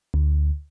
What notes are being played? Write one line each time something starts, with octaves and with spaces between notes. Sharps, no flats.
D2